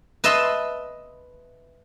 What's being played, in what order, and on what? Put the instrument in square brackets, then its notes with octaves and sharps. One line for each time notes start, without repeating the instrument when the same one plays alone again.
[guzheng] B4 D#5 E5 A5 B5 C6